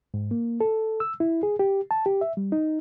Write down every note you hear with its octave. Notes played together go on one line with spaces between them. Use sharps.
G#2
A#3
A4
E6
E4
G#4
G4
A5
G4
E5
G3
D#4